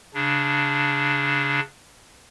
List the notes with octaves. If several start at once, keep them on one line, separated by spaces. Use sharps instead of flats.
C#3 D4